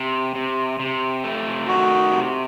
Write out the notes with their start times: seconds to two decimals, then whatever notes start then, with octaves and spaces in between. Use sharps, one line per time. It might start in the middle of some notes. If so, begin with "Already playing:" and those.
Already playing: C3
0.35 C3
0.80 C3
1.24 A3
1.67 D#3 F#4
2.12 C3